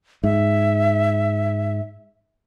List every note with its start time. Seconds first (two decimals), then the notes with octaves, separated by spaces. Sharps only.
0.24 G#2 E5